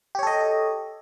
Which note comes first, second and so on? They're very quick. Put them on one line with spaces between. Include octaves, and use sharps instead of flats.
G4 C#5 A4 D#5